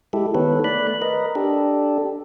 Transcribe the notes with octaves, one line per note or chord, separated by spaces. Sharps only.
G#3 E4 G4 A4
D#3 B3 A4 B4 C#5
A3 D5 B5 F#6
A#4 B4 D#5
D4 G4 A4